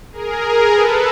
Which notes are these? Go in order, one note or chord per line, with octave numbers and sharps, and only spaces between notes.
G#4 A#4
A4 B4